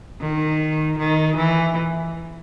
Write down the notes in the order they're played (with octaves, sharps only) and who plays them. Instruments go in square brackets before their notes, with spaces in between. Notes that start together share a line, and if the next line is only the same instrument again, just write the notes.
[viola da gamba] D#3
D#3
E3